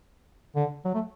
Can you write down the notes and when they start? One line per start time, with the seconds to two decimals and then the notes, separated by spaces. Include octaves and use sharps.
0.56 D3
0.85 F#3
0.94 A3